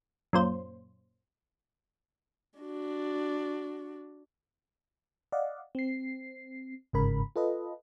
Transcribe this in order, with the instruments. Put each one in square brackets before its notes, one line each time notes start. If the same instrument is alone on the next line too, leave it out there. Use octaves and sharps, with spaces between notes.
[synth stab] F#2 A#2 C5
[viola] D4 F#4
[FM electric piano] D5 D#5 F5 F#5
C4 C7
G1 G#2 C#3 A#4 B5
F4 A4 B4 D#5